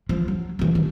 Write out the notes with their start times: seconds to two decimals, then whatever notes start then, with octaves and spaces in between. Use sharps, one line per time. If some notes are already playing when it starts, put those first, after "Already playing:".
0.09 F3
0.28 F#3
0.59 B2 E3
0.75 D#3